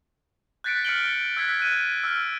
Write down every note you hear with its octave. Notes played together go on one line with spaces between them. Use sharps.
F#6 G6 A6 B6 C#7 D7
F6 C#7 D7 F#7 G7
E6 F#6 G#6 B6 C#7
F#6 D#7
E6 F6